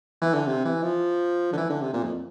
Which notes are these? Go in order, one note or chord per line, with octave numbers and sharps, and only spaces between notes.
E3
D3
C3
E3
F3
D3
E3
D3
C3
A#2
F2